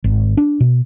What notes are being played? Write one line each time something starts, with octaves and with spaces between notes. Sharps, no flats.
G#1
D4
B2